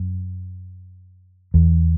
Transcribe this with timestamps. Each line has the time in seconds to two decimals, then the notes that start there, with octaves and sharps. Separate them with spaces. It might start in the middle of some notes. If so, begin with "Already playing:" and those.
Already playing: F#2
1.54 E2